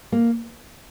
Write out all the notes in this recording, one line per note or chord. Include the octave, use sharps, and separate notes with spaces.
A#3